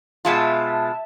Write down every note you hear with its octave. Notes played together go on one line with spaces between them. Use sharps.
B2 G#3 F4 E5 A5